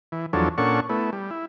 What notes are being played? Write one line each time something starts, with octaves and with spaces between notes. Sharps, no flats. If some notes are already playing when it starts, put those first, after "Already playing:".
E3
E2 F3 F#3 D4 A4 C#5
A#2 C#4 D4 A4 F#5 C#6
A3 B3 E4
G3
E4